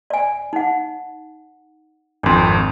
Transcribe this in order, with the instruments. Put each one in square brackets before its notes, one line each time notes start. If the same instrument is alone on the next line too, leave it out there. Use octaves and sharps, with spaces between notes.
[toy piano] D5 G#5
D#4 F#5
[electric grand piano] G#1 F2 [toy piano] D4 C6